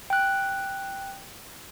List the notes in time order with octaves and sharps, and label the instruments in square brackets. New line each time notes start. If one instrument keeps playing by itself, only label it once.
[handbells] G5 F#6